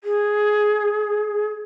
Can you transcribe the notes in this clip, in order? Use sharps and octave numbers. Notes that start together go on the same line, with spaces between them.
G#4